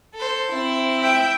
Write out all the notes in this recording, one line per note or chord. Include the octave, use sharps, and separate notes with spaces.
A4 C5
C4 E4
E5 G5